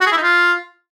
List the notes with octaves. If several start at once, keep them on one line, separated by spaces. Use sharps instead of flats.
F#4
G#4
E4
D#4
F4